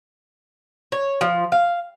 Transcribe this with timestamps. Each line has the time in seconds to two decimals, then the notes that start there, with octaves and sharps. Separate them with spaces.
0.92 C#5
1.21 F3
1.52 F5